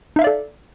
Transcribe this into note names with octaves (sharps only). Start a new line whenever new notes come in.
D#4 A4 D5 E5 F5